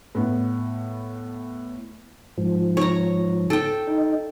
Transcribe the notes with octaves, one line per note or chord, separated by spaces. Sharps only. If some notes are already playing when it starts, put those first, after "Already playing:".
A2 B3
G#2 F3
C#5 A#5
A4 G5
D#4